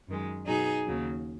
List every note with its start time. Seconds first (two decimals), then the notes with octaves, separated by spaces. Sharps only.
0.09 F#2 D#3 G#3
0.47 B2 F#3 D#4 G#4
0.86 D#2 C#3 F#3